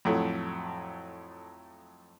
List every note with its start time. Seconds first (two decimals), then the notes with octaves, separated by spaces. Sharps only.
0.05 F2 A2 F#3 A3